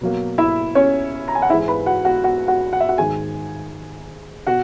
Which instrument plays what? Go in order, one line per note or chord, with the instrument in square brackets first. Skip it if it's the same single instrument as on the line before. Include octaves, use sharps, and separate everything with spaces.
[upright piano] B2 F#3 A#3
E4 E5
C#4 C#5
A#5
G#5
F#5
G#2 E3 G#3 E4 E5
B4 B5
F#4 F#5
F#4 F#5
F#4 F#5
F#4 F#5
F#5
E5
F#4 F#5
G#2 D#3 G#3 G#4 G#5
B2 F#4 F#5